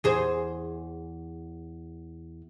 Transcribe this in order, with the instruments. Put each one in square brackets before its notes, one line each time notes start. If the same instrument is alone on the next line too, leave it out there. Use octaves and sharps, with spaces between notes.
[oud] E2 G#4 C5